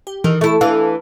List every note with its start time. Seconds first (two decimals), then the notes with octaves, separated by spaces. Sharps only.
0.07 G4
0.24 D#3 E3
0.41 A3 E4 A5 C#6
0.61 E3 D4 F5